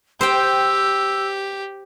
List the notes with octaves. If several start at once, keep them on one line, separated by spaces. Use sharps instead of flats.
G4 C5 G5 E6